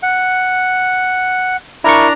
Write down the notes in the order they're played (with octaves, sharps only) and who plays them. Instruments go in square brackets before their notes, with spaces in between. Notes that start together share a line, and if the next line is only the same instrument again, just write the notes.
[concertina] F#5
[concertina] D4 A#5 [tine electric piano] E4 A#4 C#6